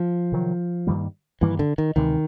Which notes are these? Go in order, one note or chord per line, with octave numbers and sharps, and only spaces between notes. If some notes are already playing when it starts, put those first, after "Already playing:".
Already playing: F3
C3 D#3 F#3
G2 D#3 G3 A#3
G2 D#3 E3 G3 A#3
D3
D#3
D2 C3 D#3 E3 G#3